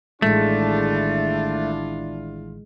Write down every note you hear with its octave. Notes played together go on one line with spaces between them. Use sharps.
A1 D#3 G#3 A3 D4 E4 F4